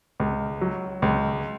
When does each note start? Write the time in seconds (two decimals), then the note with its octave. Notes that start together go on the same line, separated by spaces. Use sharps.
0.20 C#2
0.61 F#3
1.02 C#2